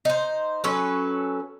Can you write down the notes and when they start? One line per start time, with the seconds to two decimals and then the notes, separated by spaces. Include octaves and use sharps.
0.05 D#4 C5
0.64 F#3 C#4 A4 B4